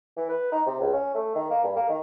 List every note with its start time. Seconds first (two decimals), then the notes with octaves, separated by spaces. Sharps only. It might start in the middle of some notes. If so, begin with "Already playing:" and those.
0.17 E3
0.29 B4
0.52 D#4
0.66 C3
0.80 C#2
0.93 C#4
1.14 A3
1.35 D#3
1.50 A#3
1.64 G2
1.76 A#3
1.89 D#3